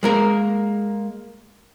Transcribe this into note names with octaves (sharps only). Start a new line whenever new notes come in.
G#3 A#3 A#4